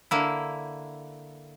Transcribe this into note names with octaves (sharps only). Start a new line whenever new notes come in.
D3 A#3 E4